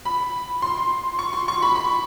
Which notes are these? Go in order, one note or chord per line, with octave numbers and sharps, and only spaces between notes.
B5
C6
C#6
C6
C#6
B5
B5